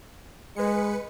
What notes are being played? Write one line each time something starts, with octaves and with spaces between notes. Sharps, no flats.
G#3 B4 C#7